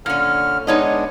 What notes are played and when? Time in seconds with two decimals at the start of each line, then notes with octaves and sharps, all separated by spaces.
0.06 A#2 D3 C#4 F6
0.67 G#3 B3 D4 D#4 C#5 D#5